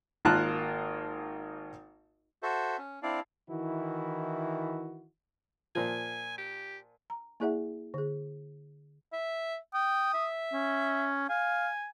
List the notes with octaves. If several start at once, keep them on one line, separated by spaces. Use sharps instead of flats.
G#1 A#3 F4 A#4 A5 F#6
F#4 A4 C5 E5
C#4
C4 D4 E4 D5 F5
D#3 E3 E4 F#4
A#2 F3 G#5
G4
A#5
A#3 E4 G#4 D5 E5 F#5
D3 G#4
E5
G5 D#6
E5
C#4
F5 G#5